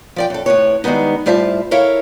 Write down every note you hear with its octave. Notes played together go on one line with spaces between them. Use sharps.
F3 D5 G5
F#2 A4
A2 C3 B4 C#5
D#3 G3 G#3 B3 D#4
A2 G3 F4 C5 E5 A5
E4 A4 A#4 C#5 E5 F5